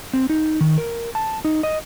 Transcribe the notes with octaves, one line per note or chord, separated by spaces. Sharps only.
C4
D#4
D#3
A#4
A5
D#4
D#5